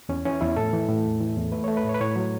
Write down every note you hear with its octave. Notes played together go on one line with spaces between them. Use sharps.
E2 C#4
E3 C#4
E2 E4
A2 A4
E3
A2
E2
E3
E2
A3 B4
A3 C#5
B4
A2 C#5
B4
A2 C#5
F#3